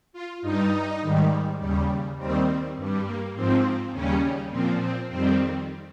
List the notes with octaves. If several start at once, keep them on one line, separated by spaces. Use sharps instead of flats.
F4
G2 G3 D#4
G#2 D#3 G3
D#2 C#3 G3
D#2 D#3 G3 C4
G2 G3
A#3
G#2 F3 C4
D#2 C#3 G3 C#4
A#2 F3 C4
C4
F2 D#3 G3 C4